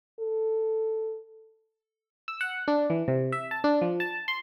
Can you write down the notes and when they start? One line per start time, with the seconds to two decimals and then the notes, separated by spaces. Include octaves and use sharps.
0.20 A4
2.28 E6
2.41 F#5
2.68 D4
2.90 E3
3.08 C3
3.32 E5
3.51 A5
3.64 D4
3.82 F3
4.00 A5
4.28 C6